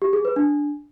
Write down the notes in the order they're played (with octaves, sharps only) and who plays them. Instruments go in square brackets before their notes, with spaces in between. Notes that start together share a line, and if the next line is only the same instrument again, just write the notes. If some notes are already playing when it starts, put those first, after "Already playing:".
[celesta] G4
G#4
B4
D4